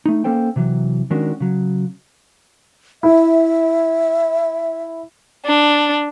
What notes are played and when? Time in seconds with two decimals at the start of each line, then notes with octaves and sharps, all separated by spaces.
0.06 A3 D#4
0.24 A#3 C#4 A4 C5 G5
0.56 C3 E3 F#3
1.11 D#3 G#3 C#4 D4 F#4 A#4
1.40 C#3 F#3
3.03 E4 E5
5.45 D4